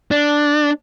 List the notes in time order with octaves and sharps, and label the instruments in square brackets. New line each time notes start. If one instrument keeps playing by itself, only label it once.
[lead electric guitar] D4